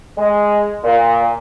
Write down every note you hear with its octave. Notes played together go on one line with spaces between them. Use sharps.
G#3
A#2